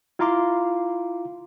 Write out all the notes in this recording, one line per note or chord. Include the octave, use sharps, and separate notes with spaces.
E4 F4 F5 A#5 C6 D6